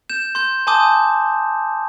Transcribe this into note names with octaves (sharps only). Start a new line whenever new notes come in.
G6 E7
C6 G6
G#5 A5 C6 D6 D#6 G6